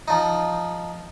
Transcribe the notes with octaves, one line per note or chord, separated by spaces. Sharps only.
F3 D#4